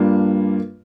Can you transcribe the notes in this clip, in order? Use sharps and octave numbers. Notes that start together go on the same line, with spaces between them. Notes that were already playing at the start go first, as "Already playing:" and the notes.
Already playing: G2 G3 A#3 D4 F4